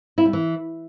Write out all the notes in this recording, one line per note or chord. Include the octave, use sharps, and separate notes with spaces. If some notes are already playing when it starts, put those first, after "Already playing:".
E4
G3
E3